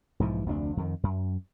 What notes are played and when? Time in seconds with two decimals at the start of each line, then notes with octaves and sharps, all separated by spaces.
0.20 B1 G#2 E3 F3
0.46 F1 D2 C4 D4
0.77 F2 D#3
1.03 F#2